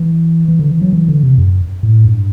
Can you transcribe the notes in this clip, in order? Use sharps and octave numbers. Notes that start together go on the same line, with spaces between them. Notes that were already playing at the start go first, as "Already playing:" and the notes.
Already playing: E3
E3
D3
E3
F#3
E3
D3
C3
F#2
A2
G2